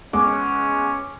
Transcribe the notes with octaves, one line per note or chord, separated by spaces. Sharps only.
G#3 B3 C#4 D6